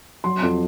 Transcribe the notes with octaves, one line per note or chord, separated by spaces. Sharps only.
F#3 C6
F2